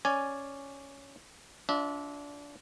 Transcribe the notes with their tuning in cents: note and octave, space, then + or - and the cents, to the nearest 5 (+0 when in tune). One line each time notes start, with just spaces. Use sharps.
C#4 +0 D5 +0 G#5 +0
D4 -25 F4 +15 E5 -30